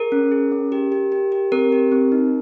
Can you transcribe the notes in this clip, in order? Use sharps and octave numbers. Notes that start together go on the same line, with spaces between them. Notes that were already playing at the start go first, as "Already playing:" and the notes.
Already playing: G#4 A#4
C#4
G#4
C#4
G4
G4
G4
G4
C4 A#4
G4
C4
D#4